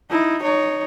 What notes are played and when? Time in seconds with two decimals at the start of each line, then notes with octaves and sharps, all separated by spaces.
0.10 D#4 E4
0.43 D#4 C#5